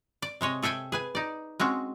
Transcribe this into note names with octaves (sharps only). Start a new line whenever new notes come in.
D5
C3 G#3 C#5 D#5
G#4 A4 E5 G5 G#5
G#4 B4 G#5
D#4 D5
G#3 C4 C#4 F#4